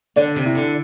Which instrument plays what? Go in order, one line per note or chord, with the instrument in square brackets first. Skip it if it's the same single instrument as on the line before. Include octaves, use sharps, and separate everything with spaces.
[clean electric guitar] D3 [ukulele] D5
[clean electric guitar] C3
[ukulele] E4
[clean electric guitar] D3